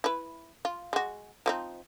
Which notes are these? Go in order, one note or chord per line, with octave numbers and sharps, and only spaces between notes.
E4 B4
F4
G#3 F#4
F3 C4 D#4